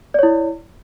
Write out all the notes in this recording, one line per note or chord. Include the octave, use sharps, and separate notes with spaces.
E4 C#5 D5